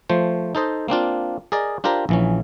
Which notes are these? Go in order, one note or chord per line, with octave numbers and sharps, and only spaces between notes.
F3 A3 C5
D#4 A4 C5 D#5
A#3 C4 D4 F4
G#4 A#4 D5 D#5
D4 F4 G4 A#4 C5
A#1 E3 C#4